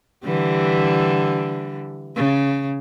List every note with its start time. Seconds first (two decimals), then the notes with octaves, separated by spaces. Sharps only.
0.24 D3 E3 G3
2.16 C#3